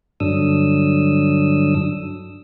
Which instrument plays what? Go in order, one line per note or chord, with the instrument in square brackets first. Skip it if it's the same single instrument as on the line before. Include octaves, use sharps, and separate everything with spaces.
[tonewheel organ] G2 D3 F#3 D4 D#6 E6